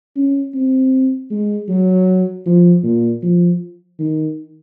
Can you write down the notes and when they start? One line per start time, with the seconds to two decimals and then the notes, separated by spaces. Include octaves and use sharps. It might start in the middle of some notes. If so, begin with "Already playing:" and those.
0.16 C#4
0.54 C4
1.30 G#3
1.68 F#3
2.46 F3
2.83 A#2
3.23 F3
3.99 D#3